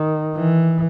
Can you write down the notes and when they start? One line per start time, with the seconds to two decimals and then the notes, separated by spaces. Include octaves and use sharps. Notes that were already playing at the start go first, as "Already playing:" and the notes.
Already playing: D#3
0.37 E3